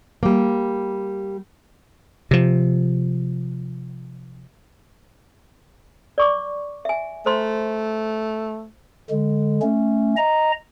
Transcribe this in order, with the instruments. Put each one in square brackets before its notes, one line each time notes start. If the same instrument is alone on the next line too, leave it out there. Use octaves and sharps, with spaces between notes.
[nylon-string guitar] G3 A#3
[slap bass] C3 F3
[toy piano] D5 C#6 D6
E5 G#5
[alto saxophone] A3 [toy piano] C5 A#5 C6
[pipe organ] D3 G#3
A3 C#4
D#5 A#5